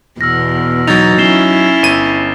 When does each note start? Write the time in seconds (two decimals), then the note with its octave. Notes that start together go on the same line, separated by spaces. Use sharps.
0.21 E2 B2 E6 F6 A#6
0.87 F#3 D#4 G#6 A6 F7
1.18 C#4 E4 C7 E7 G7
1.83 G1 D#7